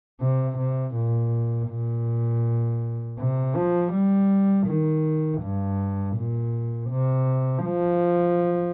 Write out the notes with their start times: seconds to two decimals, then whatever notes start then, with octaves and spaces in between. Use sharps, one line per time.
0.21 C3
0.58 C3
0.95 A#2
1.69 A#2
3.19 C3
3.56 F3
3.93 G3
4.67 D#3
5.41 G2
6.16 A#2
6.91 C3
7.65 F3